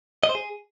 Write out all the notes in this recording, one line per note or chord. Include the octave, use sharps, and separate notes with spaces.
D#5
C5
G#4